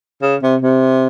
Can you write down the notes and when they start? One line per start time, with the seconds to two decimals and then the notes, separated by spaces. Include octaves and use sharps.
0.22 C#3
0.43 C3
0.62 C3